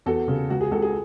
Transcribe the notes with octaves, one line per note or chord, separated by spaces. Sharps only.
E2 F#4 A4
C#3
C#2 F#4
G#4
C#2 F#4 A4
G#4